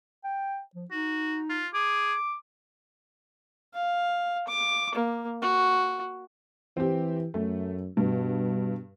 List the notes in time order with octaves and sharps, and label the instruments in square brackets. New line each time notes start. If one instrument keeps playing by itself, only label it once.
[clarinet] G5
F3
[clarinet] D#4 [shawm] F#4
[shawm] F4
[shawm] G#4 [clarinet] D6
[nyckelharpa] F5
D6
A#3
F#4
[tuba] E3 [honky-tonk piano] C4 G4
[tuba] F#2 [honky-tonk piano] A3
[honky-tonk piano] G2 [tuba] B2